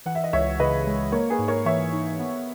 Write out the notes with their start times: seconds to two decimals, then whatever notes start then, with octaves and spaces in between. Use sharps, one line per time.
0.06 E3 F#5
0.15 E5
0.24 D#5
0.33 C#2 C#5 E5
0.60 C#3 B4 D#5
0.87 G#3
1.12 A#3 A#4 C#5
1.30 G#4 B4
1.39 G#2
1.48 A#4 C#5
1.65 E3 C#5 E5
1.92 D#4
2.19 B3